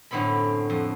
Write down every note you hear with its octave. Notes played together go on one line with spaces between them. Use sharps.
F#2 A2 D3 B3 C4 B5
F2